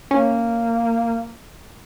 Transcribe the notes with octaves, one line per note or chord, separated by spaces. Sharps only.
A#3 C#4